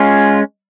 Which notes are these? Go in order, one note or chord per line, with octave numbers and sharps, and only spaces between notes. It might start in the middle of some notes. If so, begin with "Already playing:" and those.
Already playing: G#3 C#4 F4